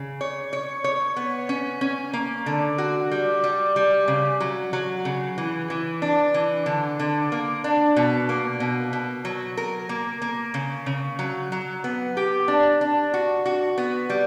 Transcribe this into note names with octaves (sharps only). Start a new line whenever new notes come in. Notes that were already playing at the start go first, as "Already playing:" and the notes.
Already playing: C#3
C#5
C#5
C#5
B3
C#4
C#4
A#3
D3
F#4
G3
G3
G3
C#3
F#3
F#3
C#3
E3
E3
D4
E3
D3
D3
A#3
D4
B2
A#3
B2
B2
F#3
A#4
A#3
A#3
C#3
C#3
F#3
F#3
B3
G4
D4
D4
F#4
F#4
B3
G3